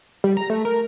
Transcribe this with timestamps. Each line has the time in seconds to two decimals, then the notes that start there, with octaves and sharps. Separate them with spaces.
0.24 G3
0.37 A#5
0.50 A3
0.65 A#4